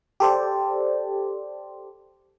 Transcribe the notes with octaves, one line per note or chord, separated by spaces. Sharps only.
G4 A4 C5 D5